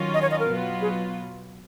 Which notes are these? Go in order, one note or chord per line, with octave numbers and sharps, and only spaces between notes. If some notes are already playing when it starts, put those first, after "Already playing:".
Already playing: D#3 F#3 C#4 F4
D#5
C#5
D#5
A#4
B2 F#3 B3 F4
G#4